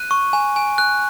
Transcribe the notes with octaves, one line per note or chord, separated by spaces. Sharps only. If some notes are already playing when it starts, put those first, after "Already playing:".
Already playing: F#6 D#7
C#6
G#5
G#5
F#6